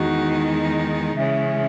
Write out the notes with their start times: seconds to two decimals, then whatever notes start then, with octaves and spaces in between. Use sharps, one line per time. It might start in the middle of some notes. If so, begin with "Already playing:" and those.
Already playing: E2 D#3 G#3 D#4 F#4
1.16 C#3 E3 G#3 C#4 E5